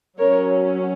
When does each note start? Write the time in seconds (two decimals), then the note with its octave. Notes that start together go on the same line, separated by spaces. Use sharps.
0.18 F#3 C#4 A#4 C#5